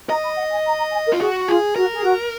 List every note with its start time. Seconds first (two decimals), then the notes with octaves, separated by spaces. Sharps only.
0.09 D#5 A#5
0.24 B5
0.37 F#5
0.51 G#5
0.66 A#5
0.78 A#5
0.92 G#5
1.07 A#4
1.13 F4
1.20 F#4 G#4
1.48 F4 G#4
1.76 F#4 A#4
1.93 G#4
2.04 F#4